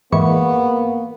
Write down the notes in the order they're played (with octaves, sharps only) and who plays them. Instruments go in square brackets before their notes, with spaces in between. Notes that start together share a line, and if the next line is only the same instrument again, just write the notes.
[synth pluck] G#2 E3 C#6 [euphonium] A#3 [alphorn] B3